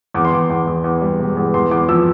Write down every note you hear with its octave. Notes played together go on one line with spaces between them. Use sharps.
E2 D6
C6
E2 D6
E2
E2
E2
G3
E1
E2
E2 C6
E2 D6
F3 E6